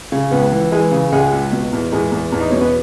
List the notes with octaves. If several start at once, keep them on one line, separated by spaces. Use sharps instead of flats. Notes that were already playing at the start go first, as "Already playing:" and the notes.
C#3
C#2 B3
E3
E3 G#3
C#3
C#2 G#3
C#2
B2
E2
E2 G#3
E2
E2
D#4
B2 C#4
B3